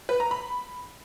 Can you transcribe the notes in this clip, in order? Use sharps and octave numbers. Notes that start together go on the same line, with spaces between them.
B4
A#5
B5